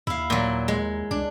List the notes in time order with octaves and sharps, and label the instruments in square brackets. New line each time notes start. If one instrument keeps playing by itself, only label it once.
[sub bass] D#2 [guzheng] E4 F5
[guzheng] A#2 F#3
G#3
[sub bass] C#2 [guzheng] D4